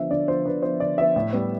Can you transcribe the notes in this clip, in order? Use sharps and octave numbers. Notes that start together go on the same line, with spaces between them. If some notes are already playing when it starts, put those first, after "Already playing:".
Already playing: D3 F3 B3 E5
D3 D5
F3 B3 C5
D3 B4
F3 B3 C5
D3 D5
F3 B3 E5
A2
G3 B3